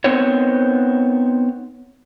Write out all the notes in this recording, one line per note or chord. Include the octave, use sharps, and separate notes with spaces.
B3 C4 D#4 A#4 C5 C#5